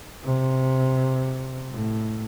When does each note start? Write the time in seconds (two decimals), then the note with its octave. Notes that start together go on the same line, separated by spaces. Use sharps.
0.25 C3
1.72 A2